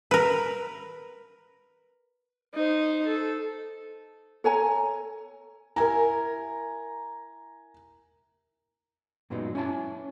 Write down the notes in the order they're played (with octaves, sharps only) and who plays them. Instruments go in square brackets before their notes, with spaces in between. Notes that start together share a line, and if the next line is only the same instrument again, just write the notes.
[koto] A#4 B4
[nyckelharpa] D#4 C5
A4
[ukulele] A4 C#5 G#5 A#5
[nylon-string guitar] E4 A#4 [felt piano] G#5 A#5
[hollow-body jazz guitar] F#2 A#2 F#3 G#3 B3 D#4
C#4 E4 C#5 A5